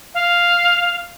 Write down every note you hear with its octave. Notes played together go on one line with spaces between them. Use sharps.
F5